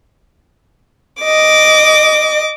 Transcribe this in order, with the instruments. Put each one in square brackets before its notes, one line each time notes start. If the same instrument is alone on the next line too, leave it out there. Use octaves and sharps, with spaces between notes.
[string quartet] D#5 D6